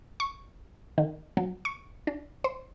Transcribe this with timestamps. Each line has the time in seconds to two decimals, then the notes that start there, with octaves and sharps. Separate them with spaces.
0.20 C#6
0.98 D#3
1.37 F#3
1.65 C#6
2.07 D4
2.44 C5